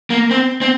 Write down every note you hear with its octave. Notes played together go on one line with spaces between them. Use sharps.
A#3
C4
C4